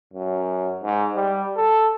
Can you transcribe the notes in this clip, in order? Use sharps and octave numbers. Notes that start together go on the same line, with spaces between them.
F#2
G#2
G3
A4